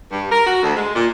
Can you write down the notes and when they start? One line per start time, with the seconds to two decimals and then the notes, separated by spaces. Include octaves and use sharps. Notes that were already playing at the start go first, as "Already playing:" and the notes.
0.12 G2
0.31 A#4
0.46 F#4
0.63 D2
0.76 G#3
0.95 A#2